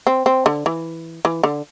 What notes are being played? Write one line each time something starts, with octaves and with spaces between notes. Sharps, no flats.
C4
C4
D3
E3
E3
D3